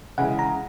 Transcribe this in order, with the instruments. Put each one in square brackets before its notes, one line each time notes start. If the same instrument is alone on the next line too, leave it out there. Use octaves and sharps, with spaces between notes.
[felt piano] C#3 E3 G#3 [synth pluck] F#5
[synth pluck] A#5